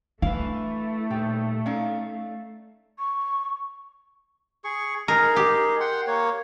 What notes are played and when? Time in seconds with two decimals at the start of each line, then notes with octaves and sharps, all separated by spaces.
0.22 A3 D4 E4 B4 F5
1.11 A#2 D#4 G4
1.66 C#4 D#4 D5 F5
2.98 C#6
4.64 G#4 C#6
5.08 D#4 G#4 A#4
5.36 G4
5.80 F#5 G5 C6
6.07 A#3 C#5